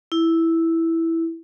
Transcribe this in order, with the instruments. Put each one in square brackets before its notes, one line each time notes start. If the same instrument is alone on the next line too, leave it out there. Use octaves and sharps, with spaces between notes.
[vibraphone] E4